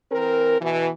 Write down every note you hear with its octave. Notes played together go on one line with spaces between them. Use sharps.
E3 C4 A#4
B2 E3